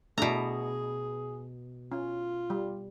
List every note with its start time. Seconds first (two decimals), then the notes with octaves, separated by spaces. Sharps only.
0.18 B2 A3 D4 E4 G#4 A#5
1.92 C#4 F4
2.50 G3